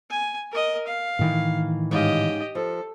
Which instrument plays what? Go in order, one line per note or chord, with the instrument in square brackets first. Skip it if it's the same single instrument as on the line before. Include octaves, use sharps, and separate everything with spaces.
[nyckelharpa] G#5
A#4 D#5
F5
[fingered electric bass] A2 D#3 E3
[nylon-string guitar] G#2 C#4 F5 [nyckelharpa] G4 D#5
[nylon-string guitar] F3 [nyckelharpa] A4